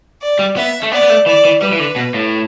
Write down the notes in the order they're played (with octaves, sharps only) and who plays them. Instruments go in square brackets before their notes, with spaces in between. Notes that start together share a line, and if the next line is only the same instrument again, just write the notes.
[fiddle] D5
[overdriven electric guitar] G3
[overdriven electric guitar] B3 [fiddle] E5
[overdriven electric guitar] A3
[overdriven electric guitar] B3 [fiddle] D5
[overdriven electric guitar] B3
A3
[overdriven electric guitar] E3 [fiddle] D5
[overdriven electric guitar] E3
[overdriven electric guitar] G3 [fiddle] B4
[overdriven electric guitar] E3
D3
B2
A2